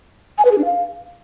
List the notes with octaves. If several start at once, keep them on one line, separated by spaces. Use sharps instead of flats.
G#5
B4
G#4
D4
F5